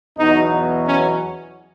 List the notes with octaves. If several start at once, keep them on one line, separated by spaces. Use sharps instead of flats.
E2 B2 F#3 D#4
C#4